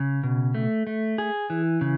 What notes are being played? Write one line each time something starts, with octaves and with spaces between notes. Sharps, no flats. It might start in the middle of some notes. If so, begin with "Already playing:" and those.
Already playing: C#3
B2
A3
A3
G#4
E3
C#3